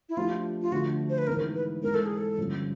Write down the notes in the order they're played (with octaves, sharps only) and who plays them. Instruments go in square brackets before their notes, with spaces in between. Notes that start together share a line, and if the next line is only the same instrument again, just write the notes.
[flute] E4
[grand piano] F3 A3 D4 G4 [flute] F4
[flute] F4
[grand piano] D3 F3 A3 D4 [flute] F#4
[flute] C5
B4
[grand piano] G#2 E3 G#3 B3 D#4 [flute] A#4
[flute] B4
[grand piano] G#2 E3 G#3 C4 [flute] A#4
[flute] A4
G#4
A4
[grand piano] G2 D3 F3 A#3 C#4